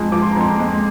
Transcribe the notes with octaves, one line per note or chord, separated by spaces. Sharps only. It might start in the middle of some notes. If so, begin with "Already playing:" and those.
Already playing: F2 F3 G#3
F3 D6
C6
A#5
F2 C6
G#3